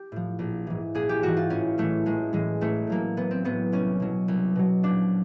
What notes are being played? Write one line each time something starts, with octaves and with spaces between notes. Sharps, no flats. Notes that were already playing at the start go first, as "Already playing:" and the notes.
Already playing: G4
A2 F3
A#1
G#2 E3
A#1 G#4
G4
G#2 E3 F#4
F4
A1 C#4
A2 E3 A3
A1 G#3
A2 E3 G#3
A1 A3
A2 F#3 A#3
A1 B3
C4
A2 F#3 B3
C2 C#4
B2 F#3
C2
B2 F#3
A#1 D4